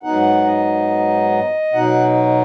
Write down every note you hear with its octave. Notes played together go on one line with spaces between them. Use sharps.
G#2 F#3 B3 D#4 F#5
D#5
B2 F#3 D#4 F#5